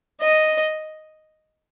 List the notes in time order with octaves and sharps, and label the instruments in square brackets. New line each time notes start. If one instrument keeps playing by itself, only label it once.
[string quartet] D#5